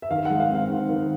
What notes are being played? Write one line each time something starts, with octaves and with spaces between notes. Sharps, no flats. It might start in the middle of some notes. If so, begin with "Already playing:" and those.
E5
D#3 F5
G#3 F#5
F5
C4
F5
D#3
D#3